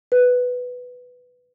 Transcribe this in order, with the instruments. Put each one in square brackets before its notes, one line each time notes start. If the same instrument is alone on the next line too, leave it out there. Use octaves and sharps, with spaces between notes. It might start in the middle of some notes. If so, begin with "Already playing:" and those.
[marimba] B4